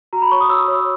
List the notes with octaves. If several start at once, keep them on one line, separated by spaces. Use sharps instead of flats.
F#4 A#5
B5
C#5 C#6
D#6
F#4 E6
C#5